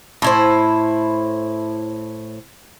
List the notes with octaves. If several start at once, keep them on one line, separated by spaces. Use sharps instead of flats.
A2 E4 C5